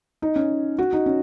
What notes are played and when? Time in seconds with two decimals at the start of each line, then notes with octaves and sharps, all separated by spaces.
0.22 D#4
0.36 C#4
0.79 F#4
0.93 D#4
1.06 C#4